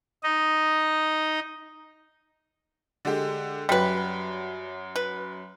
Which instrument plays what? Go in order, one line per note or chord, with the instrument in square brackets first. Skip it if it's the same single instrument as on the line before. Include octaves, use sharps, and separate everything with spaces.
[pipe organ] D#4 D#5
[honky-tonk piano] D3 G#3 G4
[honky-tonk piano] F#2 F#3 [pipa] G3 B4
[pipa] B4